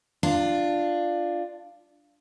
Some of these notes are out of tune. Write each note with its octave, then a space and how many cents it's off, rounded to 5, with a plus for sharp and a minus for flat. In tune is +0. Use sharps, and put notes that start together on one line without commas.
D4 +10 F4 -5